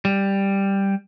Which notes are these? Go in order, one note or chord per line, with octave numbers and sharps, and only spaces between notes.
G3